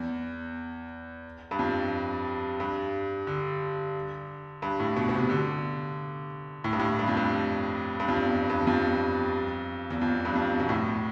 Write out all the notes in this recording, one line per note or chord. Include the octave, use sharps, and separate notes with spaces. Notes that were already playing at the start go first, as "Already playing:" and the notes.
Already playing: E2
G2
F2
G2
D3
G2
A2
B2
B2
C3
D3
A2
G2
A2
G2
F2
G2
G2
F2
E2
G2
E2
F2
E2
F2
G2
F2
B2
A2